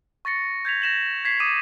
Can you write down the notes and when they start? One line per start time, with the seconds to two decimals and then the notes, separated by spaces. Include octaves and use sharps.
0.25 C#6 A6 A#6 C#7
0.65 G6 G#6 B6 F7
0.82 G6 A#6 E7 F#7
1.25 G#6 B6 C7
1.40 D6 D#6 B6 D#7 E7